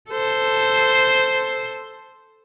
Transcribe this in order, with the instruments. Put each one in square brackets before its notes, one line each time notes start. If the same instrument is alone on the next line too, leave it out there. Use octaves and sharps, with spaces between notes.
[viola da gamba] A4 C5